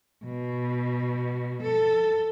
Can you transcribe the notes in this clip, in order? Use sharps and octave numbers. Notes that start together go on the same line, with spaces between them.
B2
A4